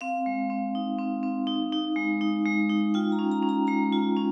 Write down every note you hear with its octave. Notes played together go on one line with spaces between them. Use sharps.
C4 F5
G#3
C4
D#4
C4
C4
D#4
D#4
G#3
D#4
G#3
D#4
F4 G5
A#5
C#4
A#5
C#4
A#5
G#3 A#5
F4
C#4